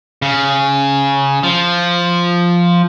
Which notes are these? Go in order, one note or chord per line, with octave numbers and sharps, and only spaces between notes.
C#3
F3